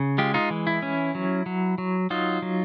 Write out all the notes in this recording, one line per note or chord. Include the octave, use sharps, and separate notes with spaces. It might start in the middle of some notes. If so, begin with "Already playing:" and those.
Already playing: C#3
G#3 F4 G4
D#4 F4
E3
E4
C#4
F#3
F#3
F#3
F#3 D#4 F4
F#3